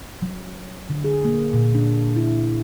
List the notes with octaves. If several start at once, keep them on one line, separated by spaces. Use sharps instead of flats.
F#3
D3
G#4
A#3
A#2
D4
E4